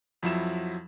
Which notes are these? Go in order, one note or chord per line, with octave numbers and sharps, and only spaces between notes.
F2 F3 F#3 E4 E5 E7